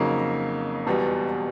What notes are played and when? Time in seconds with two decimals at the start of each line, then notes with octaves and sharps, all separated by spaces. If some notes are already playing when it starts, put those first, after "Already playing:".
Already playing: F2 C#3 F#3 A#3 D#4
0.87 E1 E2 B2 G3